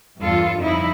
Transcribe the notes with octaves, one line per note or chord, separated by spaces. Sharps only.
E2 G2 E3 F4 A4
F2 C#3 D#4 E4